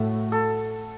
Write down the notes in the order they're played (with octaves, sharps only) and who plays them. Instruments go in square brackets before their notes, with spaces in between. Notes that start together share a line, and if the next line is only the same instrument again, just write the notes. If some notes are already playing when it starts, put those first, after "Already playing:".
Already playing: [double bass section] A2 A3 [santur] F#4
[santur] A4